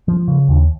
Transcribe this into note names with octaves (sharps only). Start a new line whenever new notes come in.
F3
C#3
D#2